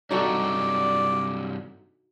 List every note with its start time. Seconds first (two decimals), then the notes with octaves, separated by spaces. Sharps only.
0.11 G2 C3 F#3 D#4 F#4 A4 D5